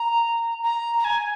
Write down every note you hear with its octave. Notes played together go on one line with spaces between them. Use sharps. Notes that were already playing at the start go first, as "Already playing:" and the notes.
Already playing: A#5
A#5
A#5
G#5